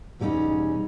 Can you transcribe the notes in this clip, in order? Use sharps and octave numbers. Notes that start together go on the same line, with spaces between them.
E2 B2 G3 C4 C#4 D#4